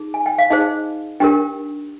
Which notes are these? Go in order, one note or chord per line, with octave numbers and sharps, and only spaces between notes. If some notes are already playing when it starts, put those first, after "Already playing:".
Already playing: D#4 G#4
G#5
G5
F5
D#4 G#4 C5 D#5
D4 G4 A#4 G5